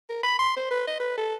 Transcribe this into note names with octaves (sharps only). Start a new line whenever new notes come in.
A#4
B5
C6
C5
B4
D#5
B4
A4